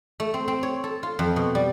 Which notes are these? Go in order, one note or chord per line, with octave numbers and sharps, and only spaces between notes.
A3
C4
C4
C#5
A4
F4
F2
B2
G3